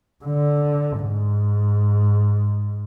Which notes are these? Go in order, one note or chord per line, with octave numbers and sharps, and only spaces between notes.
D3
G#2